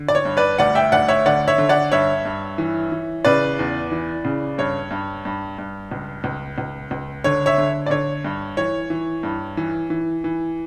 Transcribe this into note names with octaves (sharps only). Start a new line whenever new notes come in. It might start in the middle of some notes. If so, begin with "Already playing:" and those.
Already playing: D3
D5
C#5
G2
B4 D5
D2 D5 F#5
E5 G5
D2 D5 F#5
C#5 E5
D3 D5 F#5
C#5 E5
D3
D5 F#5
G2 C#5 E5
G2
E3
E3
C#3 B4 D5
E2
E3
C#3
G2 C#5
G2
G2
G2
C#2
C#2
C#2
C#2
D3 C#5
C#5 E5
D3
D5
D3 C#5
G2
E3 C#5
E3
G2
E3
E3
E3